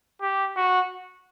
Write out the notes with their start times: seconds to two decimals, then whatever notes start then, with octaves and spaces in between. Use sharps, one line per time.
0.22 G4
0.56 F#4